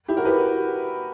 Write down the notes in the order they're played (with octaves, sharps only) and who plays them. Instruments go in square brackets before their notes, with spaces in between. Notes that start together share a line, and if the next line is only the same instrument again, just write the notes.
[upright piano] E4 G4
F#4 A#4
G4 B4